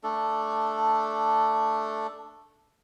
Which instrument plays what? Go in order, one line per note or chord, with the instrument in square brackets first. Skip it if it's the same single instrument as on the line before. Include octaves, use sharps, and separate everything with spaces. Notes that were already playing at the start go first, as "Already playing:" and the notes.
[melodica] A3 D4 A4